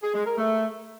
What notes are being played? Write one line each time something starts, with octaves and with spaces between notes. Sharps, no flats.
G#4
G#3
A#4
A3